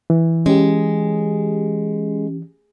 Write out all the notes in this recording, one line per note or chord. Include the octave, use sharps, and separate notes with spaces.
E3
G#3 C#4 G4